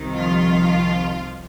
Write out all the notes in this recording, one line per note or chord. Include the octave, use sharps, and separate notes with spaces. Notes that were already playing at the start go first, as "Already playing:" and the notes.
Already playing: C2 C3 D#3
F3 F4